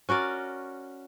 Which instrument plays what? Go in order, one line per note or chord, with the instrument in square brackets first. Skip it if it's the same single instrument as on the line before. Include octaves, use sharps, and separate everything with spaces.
[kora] C#4 F#4 A#4 D5